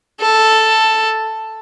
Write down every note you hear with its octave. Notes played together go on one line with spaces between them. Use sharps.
A4